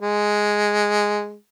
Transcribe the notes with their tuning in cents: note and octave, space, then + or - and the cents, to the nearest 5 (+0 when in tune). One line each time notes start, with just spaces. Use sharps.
G#3 +0